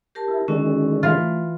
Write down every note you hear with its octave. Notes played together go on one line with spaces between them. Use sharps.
G4 A#4 A5
E4
D3 D#3 G#3 C#4 E4 F#4
E3 A3 F4